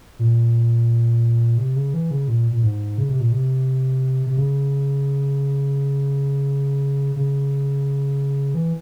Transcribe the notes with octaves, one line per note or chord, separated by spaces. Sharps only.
A#2
C3
C#3
E3
C#3
A#2
A#2
G#2
C#3
C3
A#2
C3
C3
C#3
C#3
E3